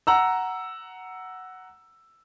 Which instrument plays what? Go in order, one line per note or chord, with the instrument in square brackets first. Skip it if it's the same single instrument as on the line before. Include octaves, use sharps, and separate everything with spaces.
[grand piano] F#5 A#5 E6